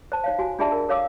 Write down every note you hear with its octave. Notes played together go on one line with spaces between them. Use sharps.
C5 A5
D#4 C#5 F5
F#4 G#5
D4 F4 G#4 D5 E5 A5
A#4
A4 C#5 F5 D6 E6